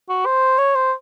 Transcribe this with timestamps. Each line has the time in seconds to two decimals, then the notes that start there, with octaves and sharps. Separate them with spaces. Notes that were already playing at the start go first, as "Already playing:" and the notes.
0.09 F#4
0.26 C5
0.58 C#5
0.75 C5